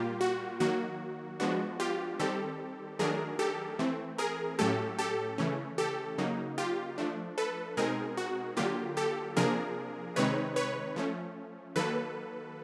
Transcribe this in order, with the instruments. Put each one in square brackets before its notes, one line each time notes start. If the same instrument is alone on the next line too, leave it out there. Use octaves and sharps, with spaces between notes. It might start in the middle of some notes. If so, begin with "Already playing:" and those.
Already playing: [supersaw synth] A#2 G3 A#3 F4 G4
F#4
D#3 F#3 A#3 F#4
F3 G#3 B3 D4 F#4
F4 G4
D#3 G3 C4 G4 A4
D#3 F#3 A3 D4 G#4 A#4
G4 A4
E3 A3 C4
G#4 A#4
A2 F#3 A3 C#4 G4 A4
G4 A4
C#3 E3 A3 C#4
G4 A4
C#3 F#3 A#3 D#4
F4 G4
F3 A3 D4
A4 B4
B2 G#3 C4 D#4 G#4 A#4
F#4
D3 F#3 A#3 F4 G4
G4 A4
C3 F3 A#3 D4 G#4 A#4
C3 D#3 G#3 C4 D#4 B4 C#5
B4 C#5
F3 A3 C#4
D#3 F#3 A#3 A4 B4